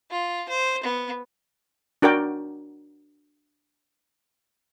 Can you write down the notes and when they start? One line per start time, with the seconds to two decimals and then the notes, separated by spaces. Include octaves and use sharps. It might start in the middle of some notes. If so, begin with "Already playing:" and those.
0.11 F4
0.49 C5
0.84 B3
2.02 D4 F#4 A#4 D5 G5